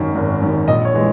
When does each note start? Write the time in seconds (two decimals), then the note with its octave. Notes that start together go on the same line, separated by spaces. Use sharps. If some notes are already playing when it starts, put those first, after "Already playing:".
Already playing: G#1 F#2 D#3
0.15 G#1
0.41 F#2 D#3
0.67 A#1 D#5
0.85 C#5
0.94 E3 G#3